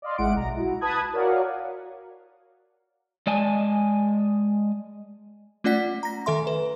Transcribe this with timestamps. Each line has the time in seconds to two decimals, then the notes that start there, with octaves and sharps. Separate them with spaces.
0.02 D5 D#5 F5 C6
0.18 G#1 G#3 E4 F#5 D7
0.35 B1 A#5
0.57 E4 F#4
0.81 B4 A5 B5 D#6 F#6 G#6
1.13 F#4 A#4 C#5 D5 F5 F#5
3.27 G#3 D5 D#5 G#5 A5
5.64 A3 C#4 F4 D5 F#5 B6
6.03 A#5 A#6
6.26 D#3 A4 E5 C6
6.47 B4